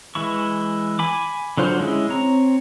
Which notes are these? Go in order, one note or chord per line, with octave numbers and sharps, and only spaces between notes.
E3 G#3 E4 C#6
G#5 B5 D6
D3 F#3 F4 C5 C#5
G#3 C#4 E4 G#4
C4 C#5 A#5